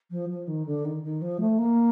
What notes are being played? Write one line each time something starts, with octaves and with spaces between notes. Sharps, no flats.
F3
F3
D#3
D3
D#3
D#3
F3
A3
A#3